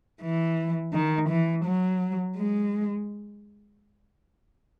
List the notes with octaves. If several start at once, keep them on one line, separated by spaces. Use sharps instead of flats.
E3
D#3
E3
F#3
G#3